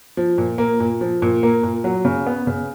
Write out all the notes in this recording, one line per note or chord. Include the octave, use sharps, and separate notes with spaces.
F3
A#2
A#3
A#2
F3
A#2
A#3
A#2
F#3
C#3
B3
C#3